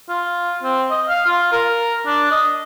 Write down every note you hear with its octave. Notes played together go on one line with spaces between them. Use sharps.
F4
C4
D#5
F5
F4
A#4
D4
D#5